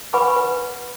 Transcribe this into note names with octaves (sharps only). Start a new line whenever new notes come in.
B4 F#5 G#5 B5 C#6 D6
B4